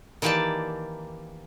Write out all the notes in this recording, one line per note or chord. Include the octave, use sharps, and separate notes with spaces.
D#3 E3 A#3 G4 D5 A5